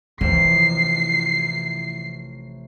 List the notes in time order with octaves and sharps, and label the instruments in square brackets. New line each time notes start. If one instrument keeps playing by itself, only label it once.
[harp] A1 C3 F3 [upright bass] E3 [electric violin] C7